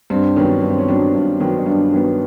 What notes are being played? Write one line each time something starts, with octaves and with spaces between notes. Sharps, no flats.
G2 C4
D#3 F#3 B3 C#4
G2 C#4
C4
C#4
D#3 F#3 B3 D4
G2
D#3 F#3 B3
D#4
G2 D4
D#3 F#3 B3